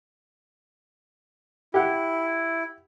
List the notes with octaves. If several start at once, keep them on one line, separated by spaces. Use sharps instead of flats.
E4 G4 F#5